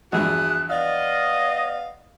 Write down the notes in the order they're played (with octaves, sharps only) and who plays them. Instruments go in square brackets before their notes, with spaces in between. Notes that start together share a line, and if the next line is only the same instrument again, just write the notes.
[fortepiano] A#1 E2 G2 [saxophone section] E4 F#4 G#4 [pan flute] F#6
[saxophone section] B3 F5 [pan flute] D5 [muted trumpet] D#5